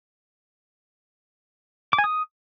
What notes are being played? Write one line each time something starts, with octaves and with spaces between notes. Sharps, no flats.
D6
G#5
D#6